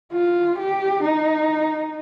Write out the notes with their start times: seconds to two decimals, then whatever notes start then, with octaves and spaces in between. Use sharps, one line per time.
0.12 F4
0.58 G4
1.03 D#4